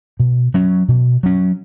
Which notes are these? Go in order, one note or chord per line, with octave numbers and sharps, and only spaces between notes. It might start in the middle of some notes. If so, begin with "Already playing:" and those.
B2
F#3 C#4
B2
F#3 C#4